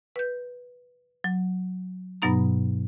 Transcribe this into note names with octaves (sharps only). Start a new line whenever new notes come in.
B4 G6
F#3
G2 B2 F#3 B3 D#4 A#5